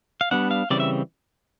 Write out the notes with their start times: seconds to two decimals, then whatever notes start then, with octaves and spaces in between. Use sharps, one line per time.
0.21 F5
0.31 G3 B3 D4 F#5
0.51 F5
0.70 C#3 E3 G3 C4 D5
0.80 E5